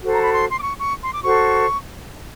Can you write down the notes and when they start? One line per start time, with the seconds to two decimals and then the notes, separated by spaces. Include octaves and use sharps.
0.04 F#4 A4 C5
0.14 A#5
0.23 B5
0.34 C6
0.49 C6
0.59 D6
0.64 C#6
0.79 C#6
1.04 C6
1.14 D6
1.24 F#4 A4 C5 C#6